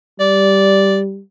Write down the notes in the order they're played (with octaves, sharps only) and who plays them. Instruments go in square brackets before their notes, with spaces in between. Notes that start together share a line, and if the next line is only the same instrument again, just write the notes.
[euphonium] G3 [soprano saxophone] D5